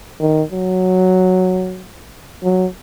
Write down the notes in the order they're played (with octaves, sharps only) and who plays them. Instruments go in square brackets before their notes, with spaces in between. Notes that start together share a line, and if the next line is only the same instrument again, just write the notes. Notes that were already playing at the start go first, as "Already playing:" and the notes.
[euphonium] D#3
F#3
F#3